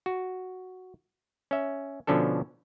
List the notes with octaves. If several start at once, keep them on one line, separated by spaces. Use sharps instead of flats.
F#4
C#4 E5
B2 D3 F3 C#4 D4 A4